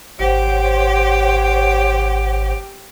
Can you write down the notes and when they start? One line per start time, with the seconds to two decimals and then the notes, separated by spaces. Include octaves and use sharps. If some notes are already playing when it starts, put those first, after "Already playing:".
0.19 G#1 G4 C5 C#5 F#5